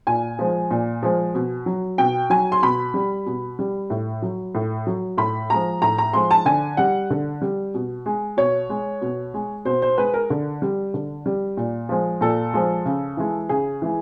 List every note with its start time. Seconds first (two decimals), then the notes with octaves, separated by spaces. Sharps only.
0.07 A#2 G#5
0.39 F3 G#3
0.71 A#2
1.03 F3 G#3
1.35 B2
1.66 F#3
1.98 B2 G5
2.30 F#3 G#5
2.52 C6
2.62 B2 B5
2.94 G3
3.26 B2
3.59 G3
3.90 A2
4.22 F#3
4.55 A2
4.87 F#3
5.18 A2 B5
5.50 F3 G#3 A#5
5.82 A2 A#5
5.98 A#5
6.13 F3 G#3 C6
6.31 A5
6.45 D3 G#5
6.77 G3 F#5
7.10 D3
7.42 G3
7.74 B2
8.06 G#3
8.37 B2 C#5
8.70 G#3
9.02 B2
9.34 G#3
9.65 B2 C5
9.82 C5
9.98 G#3 B4
10.14 A#4
10.30 D3
10.62 G3
10.94 D3
11.26 G3
11.57 A#2
11.89 F3 G#3
12.21 A#2 A4
12.53 F3 G#3
12.85 C#3
13.17 E3 G#3
13.49 C#3 G#4
13.82 E3 G#3